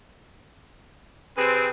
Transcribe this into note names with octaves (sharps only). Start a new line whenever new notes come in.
C3 C4 G#4 B4